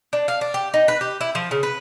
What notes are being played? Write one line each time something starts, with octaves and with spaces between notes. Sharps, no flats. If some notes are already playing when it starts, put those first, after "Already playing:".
D4
F5
D4
G4
D#4
B4
G4
E4
F3
C#3
B4